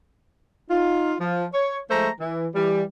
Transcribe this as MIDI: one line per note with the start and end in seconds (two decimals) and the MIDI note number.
0.71 1.15 63
0.71 1.15 65
1.21 1.47 53
1.54 1.79 73
1.90 2.10 53
1.90 2.10 56
1.90 2.10 57
1.90 2.10 72
1.90 2.10 82
2.20 2.48 52
2.55 2.82 52
2.55 2.82 55